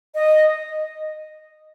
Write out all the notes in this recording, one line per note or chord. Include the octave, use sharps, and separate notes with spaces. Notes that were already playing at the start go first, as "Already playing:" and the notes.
D#5